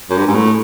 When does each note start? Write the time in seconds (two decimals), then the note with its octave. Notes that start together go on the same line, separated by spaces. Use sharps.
0.10 F#2
0.17 G2
0.27 G#2
0.35 A2